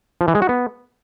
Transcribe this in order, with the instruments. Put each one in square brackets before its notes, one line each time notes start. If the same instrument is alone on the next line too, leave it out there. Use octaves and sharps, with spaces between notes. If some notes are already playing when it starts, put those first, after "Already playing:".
[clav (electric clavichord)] F3
E3
G#3
F#4
B3